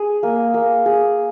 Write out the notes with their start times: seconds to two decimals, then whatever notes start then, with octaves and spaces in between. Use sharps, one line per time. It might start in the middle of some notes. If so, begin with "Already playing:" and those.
Already playing: G#4
0.23 A#3
0.54 A#3
0.86 G#4